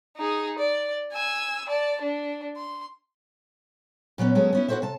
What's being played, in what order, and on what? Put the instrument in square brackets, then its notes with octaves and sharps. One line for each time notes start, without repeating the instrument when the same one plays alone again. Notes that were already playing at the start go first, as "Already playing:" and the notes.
[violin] D#4 G#4
D5
G#5 E6
D5 A5
D4
C6
[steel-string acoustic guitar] A#2 F#3 B3 C#4
F#3 G#3 B3 C#4 A4
B3 C#4 E4
E4 F#4 G4 A4 C5 E5
C3 A5